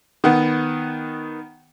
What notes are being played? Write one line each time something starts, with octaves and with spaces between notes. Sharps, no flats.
D#3 B3 F#5